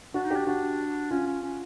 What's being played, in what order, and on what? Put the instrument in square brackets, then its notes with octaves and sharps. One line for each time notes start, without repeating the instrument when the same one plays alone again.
[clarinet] D4 [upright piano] F#4
[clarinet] D#4
[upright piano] G4
[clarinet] D4
[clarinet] D4 [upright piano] F#4
[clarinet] C#4 [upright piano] F4
[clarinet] C#4
C#4